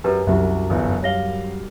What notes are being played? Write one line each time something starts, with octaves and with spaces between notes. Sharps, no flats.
F#2 G4 B4
C2 F#2 F#3 F4 G4 E5
G1 E2
G3 C#5 F5 A#6 G7